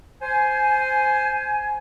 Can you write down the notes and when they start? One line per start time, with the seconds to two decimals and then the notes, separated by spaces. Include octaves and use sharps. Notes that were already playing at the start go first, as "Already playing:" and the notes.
0.22 C5 G#5